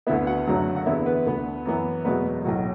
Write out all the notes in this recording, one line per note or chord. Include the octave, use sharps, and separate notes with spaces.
D2 D3 B3 E4 E5
F#4 F#5
F#1 F#2 D3 F#3 A3
F#5
E2 D3 B3 E4 E5
B3 B4
D2 D3 B3
F#2 E3 B3
E1 E2 B2 F#3 A3 B3 B4
B1 A2 F#3 F#4